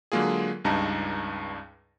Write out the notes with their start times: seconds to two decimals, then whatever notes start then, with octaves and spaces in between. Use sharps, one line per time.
0.12 D3 F#3 G#3 A#3 F4 G#4
0.65 C#2 G2 G3 D#4 A5 A#5